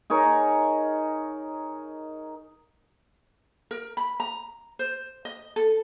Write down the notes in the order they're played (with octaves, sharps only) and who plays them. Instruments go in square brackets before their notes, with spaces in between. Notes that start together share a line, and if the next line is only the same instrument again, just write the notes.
[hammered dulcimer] D#4 G#4 A#4 C#5
[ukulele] A#4
B5
A#5
C5
D#5
A4